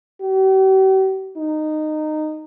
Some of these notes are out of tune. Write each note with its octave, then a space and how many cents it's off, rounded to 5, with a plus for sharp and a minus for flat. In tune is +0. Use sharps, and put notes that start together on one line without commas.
G4 -45
D#4 -15